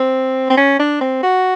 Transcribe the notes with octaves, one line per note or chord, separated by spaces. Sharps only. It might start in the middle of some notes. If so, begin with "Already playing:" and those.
Already playing: C4
C4
C#4
D4
C4
F#4